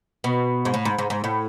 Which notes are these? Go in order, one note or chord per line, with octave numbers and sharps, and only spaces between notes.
B2
G#2
A2
G#2
G#2
G#2
A2